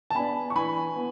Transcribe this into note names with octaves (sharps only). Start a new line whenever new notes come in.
A5
B3 D4 G#5 B5
C#6
E3 G#5 B5
B3